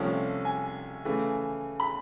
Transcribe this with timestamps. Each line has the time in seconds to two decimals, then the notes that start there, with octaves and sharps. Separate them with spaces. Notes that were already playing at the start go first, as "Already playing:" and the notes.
Already playing: C2 C3 F3 A3 C#4
0.45 G#5
1.05 C#3 E3 A3
1.80 B5